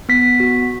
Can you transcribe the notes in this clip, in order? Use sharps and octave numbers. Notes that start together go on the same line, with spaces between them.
B3 B6
F#4